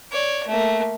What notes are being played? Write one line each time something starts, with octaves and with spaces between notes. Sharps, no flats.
C#5 D5
A3 A#3